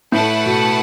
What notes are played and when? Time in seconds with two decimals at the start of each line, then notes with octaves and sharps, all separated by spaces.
0.12 A2 A3 E4 B4 F#5 A5
0.46 B2